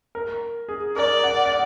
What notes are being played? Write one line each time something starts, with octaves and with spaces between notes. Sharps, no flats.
A#4
G#4
A#4 D5
F#5
F#5